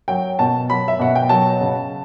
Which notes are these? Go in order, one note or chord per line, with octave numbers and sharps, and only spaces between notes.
F#3 G5
B2 A5
F#3 B5
E5
B2 F#5
G5
F#3 A5
C#3